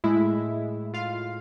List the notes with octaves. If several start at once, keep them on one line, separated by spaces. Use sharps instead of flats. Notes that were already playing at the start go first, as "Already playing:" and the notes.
A2 G#3 E4 E5
F4 F5